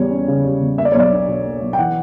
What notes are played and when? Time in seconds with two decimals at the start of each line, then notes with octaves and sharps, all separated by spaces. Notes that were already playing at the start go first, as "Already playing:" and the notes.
Already playing: E2 G3 C#5
0.11 C#4
0.28 C#3
0.44 G3
0.61 E2
0.77 A#3 E5
0.85 D5
0.92 C#5
0.95 B1
1.00 D5
1.11 D4
1.27 B2
1.45 A#3
1.62 B1
1.73 G5
1.79 E3 F#5